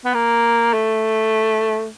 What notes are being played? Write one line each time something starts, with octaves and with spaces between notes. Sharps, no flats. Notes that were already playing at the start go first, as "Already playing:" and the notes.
B3
A#3
A3